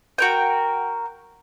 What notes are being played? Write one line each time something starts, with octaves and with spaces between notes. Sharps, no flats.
F#4 A#4 G5